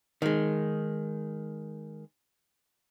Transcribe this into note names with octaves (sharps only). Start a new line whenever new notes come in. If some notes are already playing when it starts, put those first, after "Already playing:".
D#3 G#3